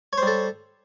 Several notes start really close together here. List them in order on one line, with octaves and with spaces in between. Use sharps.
C#5 C5 G3 A4